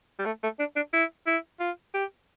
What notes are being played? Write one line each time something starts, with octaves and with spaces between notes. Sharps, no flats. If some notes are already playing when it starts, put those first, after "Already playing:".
G3
A3
A3
D4
D4
E4
E4
F4
G4